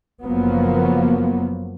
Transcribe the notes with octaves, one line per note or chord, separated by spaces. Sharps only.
F#1 F3 F#3 A#3 B3